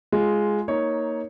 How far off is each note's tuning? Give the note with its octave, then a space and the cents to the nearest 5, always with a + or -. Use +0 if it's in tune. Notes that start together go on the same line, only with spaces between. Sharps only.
G#3 +5 F4 +0
A#3 +0 D#4 +15 C#5 +0